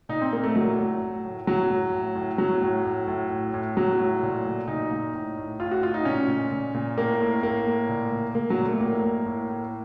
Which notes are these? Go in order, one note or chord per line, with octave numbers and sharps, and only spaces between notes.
A#2 D#4
C4
A#2 A#3
A3
A2 F#3
A2
A2
A2
A2 F#3
A2
A2
A2
A2 F#3
A2
A2
A2
A2
A2
A2 F#3
A2
A#2
A#2
A#2 D#4
A#2
A2
A2
A2 F4
F#4
A2 F4
D#4
A#2 C#4
A#2
A#2
A#2
A2 A#3
A2
A2 A#3
A2
A#2
A#2
A#2 A#3
F#3
A#2
A3
A2 A#3
A2
A2
A2